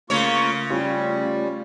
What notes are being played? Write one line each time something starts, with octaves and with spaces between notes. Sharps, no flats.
C#3 A3 A#3 F4 C#5 C#6
G3 C#4 F4